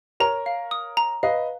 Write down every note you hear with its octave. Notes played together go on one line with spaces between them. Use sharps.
A#4 C#5 A#5
F5
D#6
A#5
B4 D#5 F5